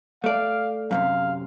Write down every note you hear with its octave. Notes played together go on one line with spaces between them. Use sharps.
A3 D5 F5
F#2 A2 C3 F5